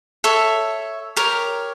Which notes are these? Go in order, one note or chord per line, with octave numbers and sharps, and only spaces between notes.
A4 C#5 E5
G4 A#4 C#5